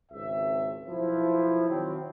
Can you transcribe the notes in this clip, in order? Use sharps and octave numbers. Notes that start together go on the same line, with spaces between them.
G#1 C#2 C4 E5
B1 F3 E4
D#3 F#3 C4